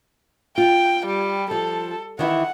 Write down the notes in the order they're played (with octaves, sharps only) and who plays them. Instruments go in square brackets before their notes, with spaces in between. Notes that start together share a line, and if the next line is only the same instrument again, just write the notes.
[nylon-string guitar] F4 [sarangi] G5
[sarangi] G3
[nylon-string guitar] F3 [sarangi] A4
[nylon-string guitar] D#3 E3 E4 [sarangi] F#5